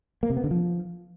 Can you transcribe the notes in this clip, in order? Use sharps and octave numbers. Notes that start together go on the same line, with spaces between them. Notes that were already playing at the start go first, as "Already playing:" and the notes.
A#3
C3
B3
D3
F3